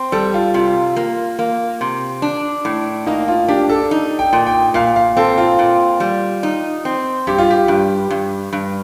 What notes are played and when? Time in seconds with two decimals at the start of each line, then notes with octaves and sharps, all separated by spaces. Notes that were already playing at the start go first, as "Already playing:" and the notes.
Already playing: C4
0.12 G3 A4
0.34 F4
0.54 C3 F4
0.96 A#3
1.39 A#3
1.81 C3
2.22 D4
2.65 A2
3.07 A#3 D#4
3.28 F4
3.48 D4 G4
3.69 A4
3.91 D#4
4.19 G5
4.33 A#2
4.46 G5
4.74 A#2 F5
4.96 F5
5.17 C4 A4
5.38 F4
5.59 A#2
6.00 G3
6.43 D#4
6.85 C4
7.27 G2 G4
7.38 F4
7.50 G4
7.68 G2
8.10 G2
8.53 G2